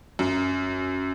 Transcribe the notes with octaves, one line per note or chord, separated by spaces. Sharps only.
F#2